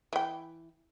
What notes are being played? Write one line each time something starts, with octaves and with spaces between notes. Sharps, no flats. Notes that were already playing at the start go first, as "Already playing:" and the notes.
E3 G5